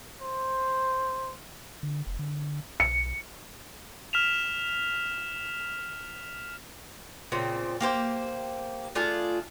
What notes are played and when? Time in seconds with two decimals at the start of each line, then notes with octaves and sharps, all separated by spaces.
0.22 C5
1.83 D3
2.06 F1
2.19 D3
2.80 B1 C#7
4.13 F6 B6 E7 F7
7.32 A#2 C#3 C4
7.81 A#3 G4 C5
8.95 A3 D4 F4 G#4